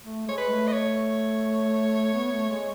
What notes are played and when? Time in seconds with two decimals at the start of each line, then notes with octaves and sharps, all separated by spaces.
0.03 A3
0.26 G#3 C#5
0.38 B4
0.50 A3
0.67 D#5
0.72 A3 C#5
2.14 B3
2.32 A3
2.49 G#3